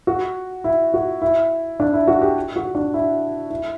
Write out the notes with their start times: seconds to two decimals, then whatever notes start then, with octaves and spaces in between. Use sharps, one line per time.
0.07 F#4
0.64 E4
0.94 F#4
1.22 E4
1.80 D4
1.94 E4
2.08 F#4
2.21 G4
2.56 F#4
2.75 D4
2.94 E4
3.50 E4